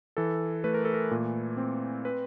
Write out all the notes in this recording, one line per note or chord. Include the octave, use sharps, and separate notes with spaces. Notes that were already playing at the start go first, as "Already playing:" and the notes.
E3 A4
A3 B4
A#4
A4
A#4
A#2
C4
B4